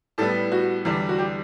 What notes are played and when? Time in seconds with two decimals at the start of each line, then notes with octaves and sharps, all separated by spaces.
0.18 A2 G3 B3 A4
0.52 F#4
0.85 E2 D3 G3 D4
1.09 F#4
1.18 G4